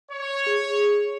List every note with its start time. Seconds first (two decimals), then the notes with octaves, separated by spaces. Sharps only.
0.12 C#5
0.46 G#4